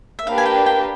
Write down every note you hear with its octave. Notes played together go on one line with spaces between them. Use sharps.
E5
A#3 D4 G4 B4 F5
G#5
G5
G5